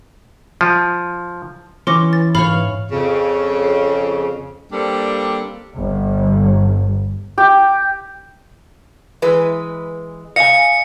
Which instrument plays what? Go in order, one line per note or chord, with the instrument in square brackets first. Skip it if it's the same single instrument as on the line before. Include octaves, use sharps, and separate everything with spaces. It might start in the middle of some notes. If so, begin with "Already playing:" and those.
[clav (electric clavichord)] F3
[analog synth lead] E3 [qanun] C#4 [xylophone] C6 D6 A#6
[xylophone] A6
[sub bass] G#2 [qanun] C#5 F5 [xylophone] B5
[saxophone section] F2 C#3
G3 A#3 C4 D4 A4
[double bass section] G1
[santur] G4
[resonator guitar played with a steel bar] E3 G#3 B4
[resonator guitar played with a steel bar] D#5 [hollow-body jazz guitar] F5 G#5 [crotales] C#7